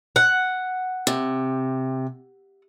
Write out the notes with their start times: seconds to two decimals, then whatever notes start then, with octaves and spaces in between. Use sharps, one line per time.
0.16 F#5
1.07 C3